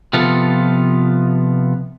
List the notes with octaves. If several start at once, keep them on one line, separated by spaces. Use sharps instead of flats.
C3 F3 B3 F4 A4